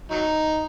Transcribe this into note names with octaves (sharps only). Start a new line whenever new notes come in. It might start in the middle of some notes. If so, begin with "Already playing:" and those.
F#3 D#4